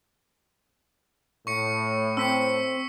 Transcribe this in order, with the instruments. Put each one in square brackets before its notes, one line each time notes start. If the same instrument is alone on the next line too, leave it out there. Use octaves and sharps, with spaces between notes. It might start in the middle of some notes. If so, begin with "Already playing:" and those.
[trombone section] A2 [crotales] C#6 C#7
[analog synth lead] C4 [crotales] E6 B6 C#7